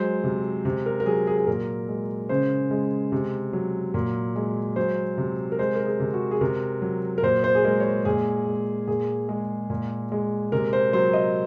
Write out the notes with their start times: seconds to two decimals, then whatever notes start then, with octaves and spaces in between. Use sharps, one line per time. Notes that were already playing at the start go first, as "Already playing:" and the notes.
Already playing: F#3 G#3 C5
0.24 C3
0.65 C3
0.86 A#4
1.00 A#4
1.06 F#3 G#4
1.27 G#4
1.38 G#4
1.47 A#2 A#4
1.89 G#3
2.29 C#3 C5
2.71 G#3
3.12 C3
3.53 F#3
3.94 A#2
4.36 G#3
4.76 F#3 C5
5.18 C3
5.52 A#4
5.59 G#3 C5
5.76 A#4
5.86 G#4
6.00 C3
6.13 F#4
6.31 G#4
6.41 C3 A#4
6.82 F#3
7.18 A#4
7.23 A#2 C5
7.44 C5
7.55 G#4
7.64 G#3 A#4
7.80 C#5
7.84 C5
8.05 A#2 G#4
8.47 G#3
8.88 A#2 G#4
9.29 G#3
9.70 A#2
10.12 G#3
10.52 C3 A#4
10.73 C5
10.93 F#3 C5
11.13 D#5